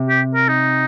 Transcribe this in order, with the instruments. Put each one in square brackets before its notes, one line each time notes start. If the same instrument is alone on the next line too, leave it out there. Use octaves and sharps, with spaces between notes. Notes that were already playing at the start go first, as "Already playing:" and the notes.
Already playing: [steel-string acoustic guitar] C3
[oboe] G4
A#4
D#4